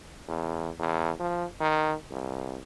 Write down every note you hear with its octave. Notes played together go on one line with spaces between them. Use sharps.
E2
E2
F3
D#3
C2